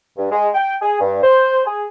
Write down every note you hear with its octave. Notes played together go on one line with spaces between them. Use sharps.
G2
G#3
G5
G#4
G2
C5
G#4